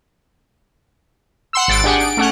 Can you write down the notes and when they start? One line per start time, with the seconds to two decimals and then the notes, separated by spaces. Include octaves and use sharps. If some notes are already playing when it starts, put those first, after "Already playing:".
1.53 F#5 C6 E6
1.68 G#1 A6 D7
1.84 D4 G4 G#4 F#5
1.99 D7
2.17 A3 C#4 F#5